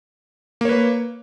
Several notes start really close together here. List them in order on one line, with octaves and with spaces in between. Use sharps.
A#3 C#5 B4